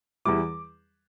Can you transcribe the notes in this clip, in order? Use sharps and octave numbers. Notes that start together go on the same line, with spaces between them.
E2 E3 G3 E4 D6